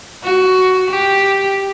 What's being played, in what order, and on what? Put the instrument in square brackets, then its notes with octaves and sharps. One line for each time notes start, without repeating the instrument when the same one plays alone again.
[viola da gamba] F#4
G4